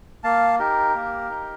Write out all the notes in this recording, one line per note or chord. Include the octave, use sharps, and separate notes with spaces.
A#3 F5 A5
D#4 G4 A#4
A#3
D#4